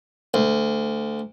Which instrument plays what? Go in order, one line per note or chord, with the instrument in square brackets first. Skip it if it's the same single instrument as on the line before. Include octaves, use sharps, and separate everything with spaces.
[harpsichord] D2